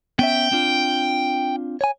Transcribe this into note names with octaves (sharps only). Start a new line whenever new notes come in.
B3 C#4 E5 G5
C4 D4 F4
C#5 G#5